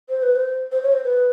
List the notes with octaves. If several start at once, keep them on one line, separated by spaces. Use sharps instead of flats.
C5
B4
C5
C5
C#5
C5
B4